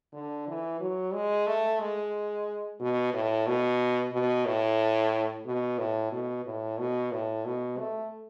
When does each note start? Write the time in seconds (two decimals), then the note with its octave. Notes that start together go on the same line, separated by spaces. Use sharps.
0.13 D3
0.48 E3
0.81 F#3
1.14 G#3
1.47 A3
1.80 G#3
2.80 B2
3.14 A2
3.47 B2
4.13 B2
4.46 A2
5.45 B2
5.78 A2
6.12 B2
6.45 A2
6.79 B2
7.12 A2
7.45 B2
7.78 A3